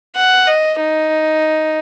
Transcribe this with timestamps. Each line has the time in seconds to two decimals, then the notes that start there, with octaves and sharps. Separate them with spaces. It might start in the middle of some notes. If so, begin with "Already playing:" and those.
0.16 F#5
0.47 D#5
0.80 D#4